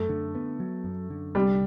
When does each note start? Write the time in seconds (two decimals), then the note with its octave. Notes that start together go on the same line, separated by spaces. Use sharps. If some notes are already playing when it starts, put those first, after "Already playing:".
Already playing: F#2 A3
0.09 D3
0.35 B3
0.60 F#3
0.84 F#2
1.10 D3
1.35 C2 G3